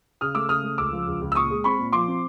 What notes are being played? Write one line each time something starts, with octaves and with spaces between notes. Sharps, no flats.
C#3 D#6 F6
A3 D6 E6
C#3 D#6 F6
A3
C#2 D6 E6
F3
C#2
C#2
E6
A#2 C#6 D#6
G#3
C4 B5 C#6
A#2
F3 C6 D6
C4